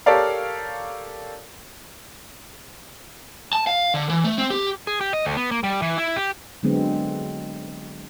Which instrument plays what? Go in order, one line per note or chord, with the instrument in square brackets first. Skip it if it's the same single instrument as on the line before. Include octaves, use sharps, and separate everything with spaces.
[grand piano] G4 A4 A#4 C#5 D5 F5
[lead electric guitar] A5
F5
D3
E3
A3
C4
G4
G#4
G4
D#5
D2
B3
A#3
G3
E3
E4
G4
[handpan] D3 F#3 G#3 B3 C4